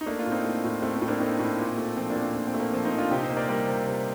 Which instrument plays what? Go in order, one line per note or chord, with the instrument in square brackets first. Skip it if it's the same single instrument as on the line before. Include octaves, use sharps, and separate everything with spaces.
[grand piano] D#4
A3 A#3 D4
D4 F4
A2
C4 D#4
A3
A2
A3 C4
C4
A2
A#3 D4
A3 C4 D#4
A2
A#2
A3
F3 C4
A#3 D4
A#2
C4
A#2 C4
C4
A3
A#3
F3 C4
C4 D#4
A#2
D4 F4
C3 D#4 G4
C5 D#5
A#3
A#4 D5
G3 A#4 D5
C3
C3